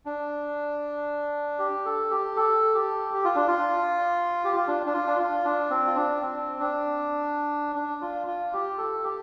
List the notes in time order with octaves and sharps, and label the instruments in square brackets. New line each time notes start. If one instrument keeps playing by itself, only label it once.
[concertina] D4
G4
A4
G4
A4
G4
G4
F4
D4
F4
G4
F4
D4
D4
F4
D4
F4
D4
C4
F4
D4
C4
D4
D4
F4
F4
G4
A4
G4